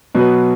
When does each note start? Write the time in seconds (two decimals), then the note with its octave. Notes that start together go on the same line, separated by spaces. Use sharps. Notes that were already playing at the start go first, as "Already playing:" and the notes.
0.15 B2 F#3 B3 F#4 B4